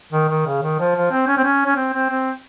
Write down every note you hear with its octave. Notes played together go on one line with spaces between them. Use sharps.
D#3
D#3
C#3
D#3
F3
F3
C4
C#4
C4
C#4
C#4
C4
C4
C4